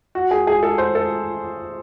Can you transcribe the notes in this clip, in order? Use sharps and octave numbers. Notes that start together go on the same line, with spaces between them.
F#4
G#4
G#4
A4
C5
A4